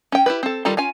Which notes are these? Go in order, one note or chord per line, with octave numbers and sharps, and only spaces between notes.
C#4 G5
E4 G4 B4
C4 A4
D#3 G3 F4 A4 A#5
C#4 F4 G#5